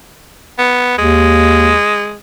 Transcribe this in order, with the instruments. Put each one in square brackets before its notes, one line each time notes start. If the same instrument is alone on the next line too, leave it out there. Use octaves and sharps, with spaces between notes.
[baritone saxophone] B3
[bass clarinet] D#2 [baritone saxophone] G#3